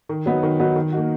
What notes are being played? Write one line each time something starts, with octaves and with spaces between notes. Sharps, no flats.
D#3
F#3 B3 D#4 F#4
D#3
F#3 B3 D#4 F#4
D#3
A#3 D#4 F#4